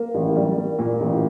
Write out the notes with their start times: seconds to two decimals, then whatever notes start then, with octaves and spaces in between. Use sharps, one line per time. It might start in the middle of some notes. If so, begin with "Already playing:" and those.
Already playing: A#3
0.15 A1
0.36 G3
0.57 A#3
0.79 A#2
1.01 A1